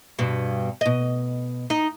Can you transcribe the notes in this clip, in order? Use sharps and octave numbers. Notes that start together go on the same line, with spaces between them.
G2 B2
B2 D#5
D#4